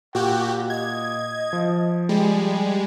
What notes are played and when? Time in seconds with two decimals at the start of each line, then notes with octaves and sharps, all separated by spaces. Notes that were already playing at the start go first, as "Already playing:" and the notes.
0.15 A#2 F#4 G4 F#5
0.70 D#5 G#6
1.53 F3
2.09 G3 G#3